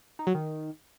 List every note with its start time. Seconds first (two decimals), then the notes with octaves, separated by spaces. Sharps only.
0.19 D#4
0.27 F#3
0.35 D#3